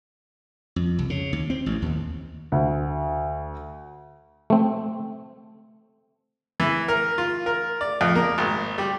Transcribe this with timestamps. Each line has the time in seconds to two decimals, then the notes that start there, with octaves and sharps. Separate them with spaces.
0.76 F2
0.99 C2
1.10 C#3
1.33 D#2
1.50 C4
1.66 A1
1.82 D#2
2.52 D2
4.50 A3 C4
6.60 E3
6.88 A#4
7.18 F4
7.46 A#4
7.81 D5
8.01 F2
8.15 A#3
8.38 G#1
8.78 G3